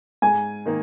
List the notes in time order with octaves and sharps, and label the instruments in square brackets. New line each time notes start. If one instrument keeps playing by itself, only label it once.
[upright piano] G#2 [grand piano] G#5
[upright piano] D#3 A#3 D#4